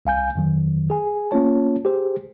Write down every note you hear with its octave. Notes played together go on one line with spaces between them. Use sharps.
C2 F5 G#5 G6
F2 D#3 F#3
G#4 G#5
A#3 C#4 F4 C#5 A5
G4 G#4 C5